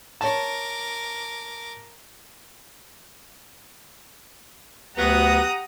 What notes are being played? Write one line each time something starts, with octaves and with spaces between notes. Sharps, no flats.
A#4 C#5 A5 D6
D2 F#3 B3 G4 F#5 A#5 D#6